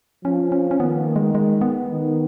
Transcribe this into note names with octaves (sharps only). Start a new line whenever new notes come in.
F3 C#4
C#4
C#4
D#3 B3
A#3
G#3
G#3
B3
D#3